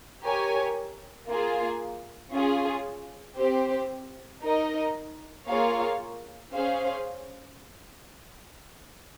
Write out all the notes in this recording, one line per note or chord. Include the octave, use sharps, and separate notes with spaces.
G4 A#4 C#5 G#5
A#3 F4 G#4
C#4 F4 G#4
C4 G4 C5
D#4 A#4 D#5
A#3 F4 G#4 C#5 F5
C#4 G#4 C5 F5